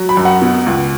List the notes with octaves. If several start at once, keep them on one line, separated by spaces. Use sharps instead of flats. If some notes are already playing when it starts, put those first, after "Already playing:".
Already playing: F#3
B5
F#2
F#5
B2
C#2